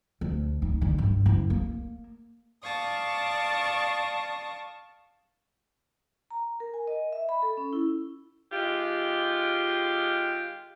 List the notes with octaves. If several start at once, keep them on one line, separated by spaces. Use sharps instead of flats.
D2
D#4
D3
G2
F#1
A#3
D5 F5 A5 C#6 D#6
A#5
A#4
G#5
D#5
E5
B5
A4
C#4
E4
D#3 G#3 F4 G4